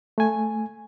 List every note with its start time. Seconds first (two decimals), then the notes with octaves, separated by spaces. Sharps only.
0.18 A3 G#5